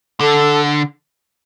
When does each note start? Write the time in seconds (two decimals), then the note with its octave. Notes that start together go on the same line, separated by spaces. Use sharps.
0.20 D3 A4